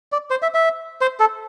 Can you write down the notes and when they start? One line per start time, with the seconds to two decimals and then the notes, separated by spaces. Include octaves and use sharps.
0.12 D5
0.30 C5
0.42 E5
0.54 E5
1.01 C5
1.20 A4